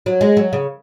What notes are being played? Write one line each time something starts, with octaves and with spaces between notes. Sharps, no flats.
F#3
G#3
F#3
C#3